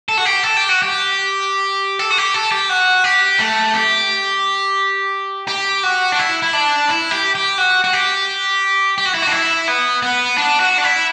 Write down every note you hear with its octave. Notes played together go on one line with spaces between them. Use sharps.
A4
F#4
G4
A4
G4
F#4
G4
A4
F#4
G4
A4
G4
F#4
G4
A3
G4
G4
F#4
D4
E4
E4
D4
E4
G4
G4
F#4
F#4
G4
G4
F#4
E4
F#4
D4
E4
B3
B3
D4
F#4
D4
E4